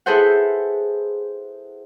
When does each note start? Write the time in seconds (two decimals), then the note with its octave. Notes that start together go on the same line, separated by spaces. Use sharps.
0.06 E4 G#4 A4 B4 C5 F#5